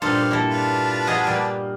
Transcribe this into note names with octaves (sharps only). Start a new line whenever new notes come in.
G2 A#2 D#4 A4 C5 D5 F5 C6
A#3 E4 A4 A5
D4 F4 B4
G#4 D#5 F#5
G3 A#3